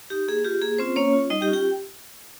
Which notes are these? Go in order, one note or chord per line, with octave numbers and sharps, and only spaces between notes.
D#4 G4
A#3 G#4
F4 G4
A#3 G#4
C4 C#4 F4 C5
A#3 C#4 C#5
F4
G3 D#4 D#5
G4 G5
C#4 F4
G4 G5